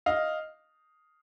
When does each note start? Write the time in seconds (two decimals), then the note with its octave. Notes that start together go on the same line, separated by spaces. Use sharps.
0.06 D#5 F5